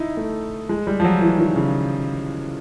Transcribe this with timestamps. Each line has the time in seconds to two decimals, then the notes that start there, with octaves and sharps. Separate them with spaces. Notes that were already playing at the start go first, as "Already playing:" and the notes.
Already playing: D#4 E4
0.17 A3
0.69 G#3
0.87 G3
1.00 F3
1.04 F#3
1.21 E3
1.38 D#3
1.56 C#3